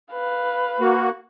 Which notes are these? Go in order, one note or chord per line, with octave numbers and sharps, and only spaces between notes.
B4 F5
A#3 F#4